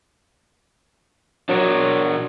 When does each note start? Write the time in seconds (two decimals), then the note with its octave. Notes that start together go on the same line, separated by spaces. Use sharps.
1.49 F#3 D4 A#4